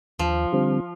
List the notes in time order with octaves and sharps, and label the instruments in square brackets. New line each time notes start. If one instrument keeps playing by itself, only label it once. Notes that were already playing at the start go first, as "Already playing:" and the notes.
[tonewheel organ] D#2 [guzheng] F3
[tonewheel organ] D3 G3 C4